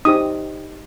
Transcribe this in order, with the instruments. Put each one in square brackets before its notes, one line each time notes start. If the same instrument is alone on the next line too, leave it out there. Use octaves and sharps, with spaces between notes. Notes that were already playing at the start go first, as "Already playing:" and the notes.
[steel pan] D#4 G4 C5 D#6